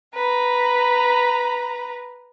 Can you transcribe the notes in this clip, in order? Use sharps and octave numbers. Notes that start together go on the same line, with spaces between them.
B4 A#5